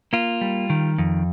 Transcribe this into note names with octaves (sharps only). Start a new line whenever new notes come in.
A#3 F4
G3
D#3
F2